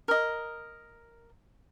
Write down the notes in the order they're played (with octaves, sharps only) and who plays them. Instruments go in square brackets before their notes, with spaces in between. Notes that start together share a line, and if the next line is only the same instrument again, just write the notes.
[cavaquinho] A#4 D#5